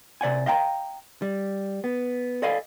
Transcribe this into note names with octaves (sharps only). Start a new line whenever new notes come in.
C3 D5 F#5 G#5
D#5 F5 G5 A#5
G3
B3
A4 D5 D#5 F5 G#5 B5